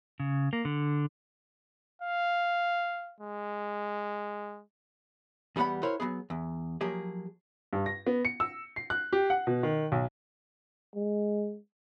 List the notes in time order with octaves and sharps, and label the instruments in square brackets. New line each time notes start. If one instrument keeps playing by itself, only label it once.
[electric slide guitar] C#3
A#3
D3
[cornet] F5
G#3
[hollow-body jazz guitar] E2 G3 B3 C#5 F#5 B5
E4 F#4 A#4 C5 C#5
F#3 A#3 B3 G#4
E2
F3 F#3 A#3 G4 G#4
[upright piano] G2
A#6
B3
C#7
E6
C7
F#6
G4
F#5
B2
D#3
B1
[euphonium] G#3